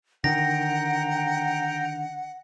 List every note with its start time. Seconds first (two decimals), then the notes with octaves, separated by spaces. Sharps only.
0.24 D3 D#3 F#5 G5 A#5 A#6